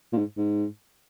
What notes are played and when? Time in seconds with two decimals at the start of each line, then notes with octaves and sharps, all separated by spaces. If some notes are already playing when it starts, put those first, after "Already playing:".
0.13 A#2
0.18 G#2
0.37 G#2